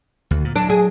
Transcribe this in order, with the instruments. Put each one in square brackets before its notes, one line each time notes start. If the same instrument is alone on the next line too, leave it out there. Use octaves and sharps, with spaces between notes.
[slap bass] D2
A#2
[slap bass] F#3 [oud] D4
[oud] G#4